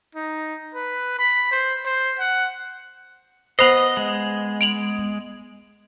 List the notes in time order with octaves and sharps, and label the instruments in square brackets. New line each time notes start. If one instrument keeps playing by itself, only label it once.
[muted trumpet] D#4
B4
B5
C5
C5
F#5
[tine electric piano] B3 B4 C7 [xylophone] C5 F7 F#7 [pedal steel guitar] D#5
[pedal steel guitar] G#3
[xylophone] D7 F7 F#7